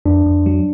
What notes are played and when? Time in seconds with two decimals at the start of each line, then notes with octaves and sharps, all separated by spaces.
0.05 F2 D4
0.26 F2
0.46 F#3